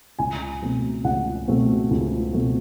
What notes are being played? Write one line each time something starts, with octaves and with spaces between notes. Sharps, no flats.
C#2 G#5
B2 F#3 A3 C4
C#2 F#5
B2 F#3 A3 C4
C#2
B2 F#3 A3 C4